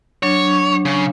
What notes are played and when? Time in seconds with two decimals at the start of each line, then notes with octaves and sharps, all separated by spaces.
0.23 F#3 D4 C#5
0.85 C#3